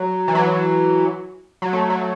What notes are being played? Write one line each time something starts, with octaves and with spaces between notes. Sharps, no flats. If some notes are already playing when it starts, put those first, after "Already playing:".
Already playing: F#3
E3
F#3
F#3
A3
F#3